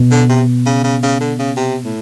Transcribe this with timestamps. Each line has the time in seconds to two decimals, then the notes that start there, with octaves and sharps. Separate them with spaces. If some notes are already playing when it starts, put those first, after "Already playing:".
Already playing: B2
0.11 D3
0.29 C3
0.66 C#3
0.84 C#3
1.03 C#3
1.20 D3
1.39 C#3
1.57 C3
1.85 A2